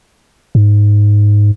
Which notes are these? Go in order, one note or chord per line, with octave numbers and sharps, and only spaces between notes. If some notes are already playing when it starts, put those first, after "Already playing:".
G#2